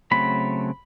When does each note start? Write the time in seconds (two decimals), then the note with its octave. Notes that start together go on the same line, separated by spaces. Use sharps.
0.11 C#3 F#3 A3 C4 B5